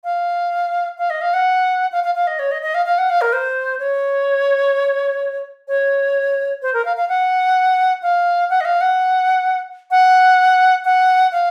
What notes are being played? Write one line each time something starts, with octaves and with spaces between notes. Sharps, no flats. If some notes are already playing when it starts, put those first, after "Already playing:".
F5
F5
D#5
F5
F#5
F5
F5
F5
D#5
C#5
D#5
D#5
F5
F5
F#5
F5
A#4
C5
C#5
C#5
C5
A#4
F5
F5
F#5
F5
F#5
D#5
F5
F#5
F#5
F#5
F5